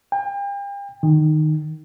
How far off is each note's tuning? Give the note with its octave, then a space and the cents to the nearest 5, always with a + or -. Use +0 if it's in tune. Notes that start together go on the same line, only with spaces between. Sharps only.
G5 +40
D#3 -15